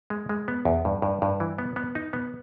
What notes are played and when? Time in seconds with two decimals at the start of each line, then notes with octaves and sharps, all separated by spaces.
0.10 G#3
0.29 G#3
0.48 B3
0.65 E2
0.85 G2
1.02 G2
1.22 G2
1.40 E3
1.58 B3
1.76 B3
1.95 D#4
2.13 B3